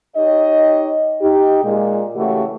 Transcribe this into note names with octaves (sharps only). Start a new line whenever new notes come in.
D#4 G4 C#5 D#5
D#4 G4
A#2 G#3
C#3 E3 A3 C#4 F#4 G4